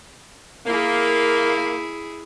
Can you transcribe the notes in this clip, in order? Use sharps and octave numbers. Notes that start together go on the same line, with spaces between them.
A#3 E4 G#4